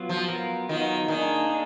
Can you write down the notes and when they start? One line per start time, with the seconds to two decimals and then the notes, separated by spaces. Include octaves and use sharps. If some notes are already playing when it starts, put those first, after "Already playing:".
Already playing: F#3 B3 F4
0.09 F3
0.28 F#3 B3 F4 A#4
0.69 D#3 F#3 B3 F4 A#4
1.08 D#3 A#3 D4 G#4
1.49 A#3 D4 G#4